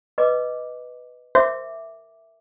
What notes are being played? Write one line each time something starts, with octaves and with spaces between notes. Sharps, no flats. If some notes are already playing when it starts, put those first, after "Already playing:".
B4 D#5 D6
A#4 C5 E5 D6